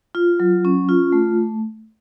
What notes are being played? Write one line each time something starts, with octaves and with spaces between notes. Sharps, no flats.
F4
F#3
C#4
F4
A3